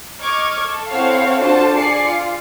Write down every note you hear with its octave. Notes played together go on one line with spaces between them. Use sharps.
D#5 C#6 D6 F6 G#6
A4
C4 E4 A4 C#5 F5 F#5
D4 F4 F#4 A4 C5 A5
G#4 D5 G#5 C7 C#7
F4